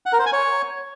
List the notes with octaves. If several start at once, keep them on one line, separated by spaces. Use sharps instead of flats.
F#5
A#4
C5
G#5
C#5